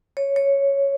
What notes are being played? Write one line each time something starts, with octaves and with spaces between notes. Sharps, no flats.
C#5
C#5